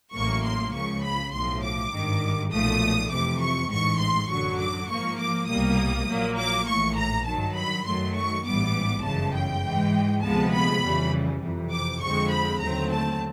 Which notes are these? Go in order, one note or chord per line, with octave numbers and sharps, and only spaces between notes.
A1 A2 F#3 A#3 C#6
C6
C#2 C#3 F3 C#6
B5
B1 A2 F3 C6
D6
G#1 G2 D#3
B1 A#2 F3 A3 D#6
F2 C3 E3 D6
C#6
A1 G#2 E3 C#6
C6
F#2 D3 F#3 C#6
D6
G#2 F3 A#3 C#6
D6
C2 B2 G3 A#3 D#6
A#1 A#2 F#3 A#3
D6
A#1 A2 E3 C#6
A#5
G2 D#3 F#3 A5
B5
F#2 D#3 F#3 A3 C6
C#6
A1 G#2 E3 G3 B3 D6
G1 F#2 C#3 E3 G#3 A5
G5
G#2 E3 G#3
D2 C3 F3 G#3 B3 A5
B5
F2 C#3 E3 G3
F2 C3 E3
D6
F2 D3 F3 G#3 C4 C#6
B5
D#2 D3 F#3 A3 C4 A#5
A5